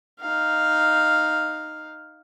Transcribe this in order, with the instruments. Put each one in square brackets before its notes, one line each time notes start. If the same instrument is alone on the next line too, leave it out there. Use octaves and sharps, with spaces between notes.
[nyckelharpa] D#4 F5